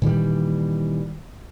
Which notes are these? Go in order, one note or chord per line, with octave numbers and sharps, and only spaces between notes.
A#2 D#3 E3 G3